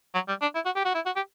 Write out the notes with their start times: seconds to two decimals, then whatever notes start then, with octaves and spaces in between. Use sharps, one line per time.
0.14 F#3
0.28 G3
0.41 D4
0.55 E4
0.65 F#4
0.75 G4
0.85 F#4
0.95 E4
1.06 F#4
1.16 G4